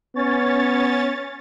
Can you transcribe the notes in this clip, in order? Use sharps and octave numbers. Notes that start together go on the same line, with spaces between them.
B3 C#4 C#5 A6